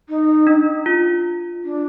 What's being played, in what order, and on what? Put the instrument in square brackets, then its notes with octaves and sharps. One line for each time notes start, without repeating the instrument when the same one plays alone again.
[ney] D#4
[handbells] D4
F4
[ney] D4